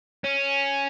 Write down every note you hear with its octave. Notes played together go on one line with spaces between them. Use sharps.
C#4